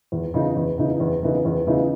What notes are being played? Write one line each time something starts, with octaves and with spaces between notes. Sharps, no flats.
E2
C#3 E3 B3 D#4
E2
C#3 E3 B3 D#4
E2
C#3 E3 B3 D#4
E2
C#3 E3 B3 D#4